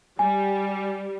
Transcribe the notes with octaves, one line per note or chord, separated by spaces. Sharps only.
G3 G#5